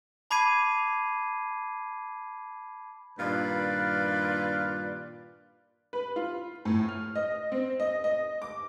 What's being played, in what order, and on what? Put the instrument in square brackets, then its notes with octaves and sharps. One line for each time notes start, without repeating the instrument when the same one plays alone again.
[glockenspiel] A5 B5 D6 G#6 C7 D#7
[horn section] G2 A#2 D#3 F4 B4 D5
[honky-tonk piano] B4
F4
A2
F6
D#5
C4
D#5
D#5
D6